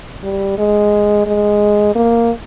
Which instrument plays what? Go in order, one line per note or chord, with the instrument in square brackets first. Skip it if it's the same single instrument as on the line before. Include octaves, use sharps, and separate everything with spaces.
[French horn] G3
G#3
G#3
A#3